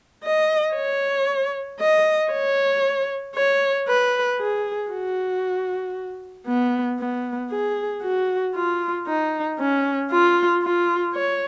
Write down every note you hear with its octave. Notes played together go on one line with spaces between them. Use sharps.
D#5
C#5
D#5
C#5
C#5
B4
G#4
F#4
B3
B3
G#4
F#4
F4
D#4
C#4
F4
F4
C#5